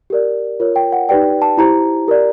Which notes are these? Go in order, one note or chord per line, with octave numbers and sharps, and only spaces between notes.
G4 A#4 D5
F4 A#4 C#5
G5
F#5
D#4 G4 B4 D5 G5
A5
E4 G4 C5 A#5
G4 A#4 D5